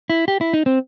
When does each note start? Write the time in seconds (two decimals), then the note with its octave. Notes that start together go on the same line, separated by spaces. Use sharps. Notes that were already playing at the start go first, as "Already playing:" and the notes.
0.10 E4
0.28 G4
0.41 E4
0.54 D#4
0.66 C4